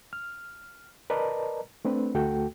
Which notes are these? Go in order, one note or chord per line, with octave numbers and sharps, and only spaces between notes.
F6
A#4 B4 D5 D#5 A5 A#5
A3 C4 D4 B4
D2 A3 F#4 A4 G5